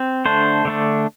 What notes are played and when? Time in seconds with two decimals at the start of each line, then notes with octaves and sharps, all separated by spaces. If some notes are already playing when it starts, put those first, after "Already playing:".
Already playing: C4
0.25 D3 A3 D4 C5
0.65 D3 A3 D4